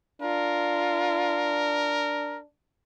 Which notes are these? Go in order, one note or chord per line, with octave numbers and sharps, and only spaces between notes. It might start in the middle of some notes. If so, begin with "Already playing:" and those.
D4 F4 A#4